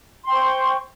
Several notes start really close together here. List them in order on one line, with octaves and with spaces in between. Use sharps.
C6 G5 C5 C#6